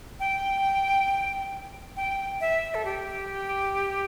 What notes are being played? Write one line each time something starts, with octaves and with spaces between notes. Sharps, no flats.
G5
G5
E5
A4
G4